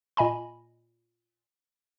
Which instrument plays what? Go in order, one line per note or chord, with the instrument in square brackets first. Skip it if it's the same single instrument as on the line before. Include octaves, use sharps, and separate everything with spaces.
[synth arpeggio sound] A#2 D#5 G#5 B5